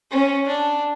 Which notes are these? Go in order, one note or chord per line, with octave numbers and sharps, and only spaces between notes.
C#4
D4